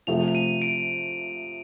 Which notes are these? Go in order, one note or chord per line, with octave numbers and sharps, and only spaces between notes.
C3 F3 A3 F7
F7
D#7
D7